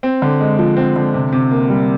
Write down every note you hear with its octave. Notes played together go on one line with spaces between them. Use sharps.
C4
D3
G#3
F3
C4
D3
C3
C3
A#3
G3